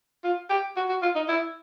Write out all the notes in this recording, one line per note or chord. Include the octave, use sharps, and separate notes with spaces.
F4
G4
F#4
F#4
F4
D#4
E4